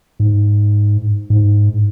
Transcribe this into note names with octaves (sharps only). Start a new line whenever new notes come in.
G#2
G#2